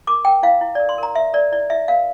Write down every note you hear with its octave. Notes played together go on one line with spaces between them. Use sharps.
A#4 D6
A#4 G5
E4 F5
E4
D5
A#4
C6
A#4 A#5
A#4 E5
A#4 D5
E4 D5
E4 E5
A#4 F5